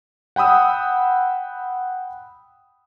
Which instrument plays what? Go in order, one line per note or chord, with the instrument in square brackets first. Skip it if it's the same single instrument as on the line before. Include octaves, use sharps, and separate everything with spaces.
[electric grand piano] F#5 G5 B5 D#6 E6